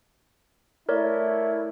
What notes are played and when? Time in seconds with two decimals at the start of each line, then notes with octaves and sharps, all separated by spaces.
0.89 A3 E4 A#4 C#5 D5